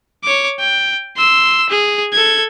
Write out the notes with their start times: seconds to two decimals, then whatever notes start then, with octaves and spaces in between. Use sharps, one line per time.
0.24 C#5 D6
0.60 G5
1.17 C6 E6
1.69 G#4
2.13 A4 G#6